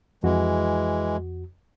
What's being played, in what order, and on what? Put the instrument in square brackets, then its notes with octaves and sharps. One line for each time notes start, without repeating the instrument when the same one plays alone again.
[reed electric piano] F2 F#4 [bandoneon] E3 G#3